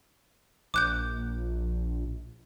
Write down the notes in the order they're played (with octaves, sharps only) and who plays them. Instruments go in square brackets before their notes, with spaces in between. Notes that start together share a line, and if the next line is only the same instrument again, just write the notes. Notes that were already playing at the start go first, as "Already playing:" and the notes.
[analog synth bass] A#1 [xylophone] D6 F#6 G6